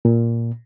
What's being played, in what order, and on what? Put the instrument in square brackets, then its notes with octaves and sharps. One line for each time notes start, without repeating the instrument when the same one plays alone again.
[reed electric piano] A#2